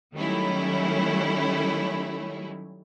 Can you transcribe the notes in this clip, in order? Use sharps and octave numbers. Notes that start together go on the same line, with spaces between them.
D#3 F#3 G3 A3 C#4 E4